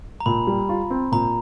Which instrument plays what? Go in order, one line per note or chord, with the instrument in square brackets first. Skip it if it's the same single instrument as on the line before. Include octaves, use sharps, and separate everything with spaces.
[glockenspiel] A#5
[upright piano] A#2 [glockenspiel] B5
[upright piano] G3
F4
C4
[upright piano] A#2 [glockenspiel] A#5